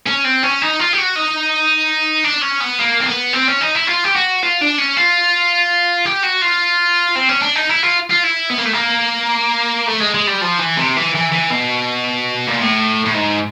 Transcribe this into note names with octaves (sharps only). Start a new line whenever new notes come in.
C#4
C4
C#4
D#4
F4
G4
F#4
D#4
D4
C#4
B3
A#3
C4
B3
C4
C#4
D#4
E4
F4
G4
F#4
F4
D4
C#4
F4
G4
F#4
F4
C4
C#4
D4
D#4
E4
F4
F4
E4
B3
A#3
A3
A#3
A3
G#3
G#3
G3
F3
E3
C3
E3
E3
E3
B2
A#2
A2
A2
G#2